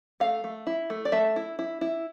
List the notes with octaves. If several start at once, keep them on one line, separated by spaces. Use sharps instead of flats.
A3 F5
A3
E4
A3
D5
A3 E5
E4
E4
E4